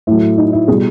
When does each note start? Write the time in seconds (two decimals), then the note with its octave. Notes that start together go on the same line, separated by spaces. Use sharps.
0.07 A2 F#3 E4
0.38 D#4
0.53 E4
0.68 B2 G3 G#4